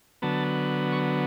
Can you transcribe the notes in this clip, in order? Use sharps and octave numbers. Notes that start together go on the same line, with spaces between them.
D3 F#3 B3 A5
C#6